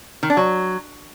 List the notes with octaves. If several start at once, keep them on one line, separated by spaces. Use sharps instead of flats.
D#3
D4
F#3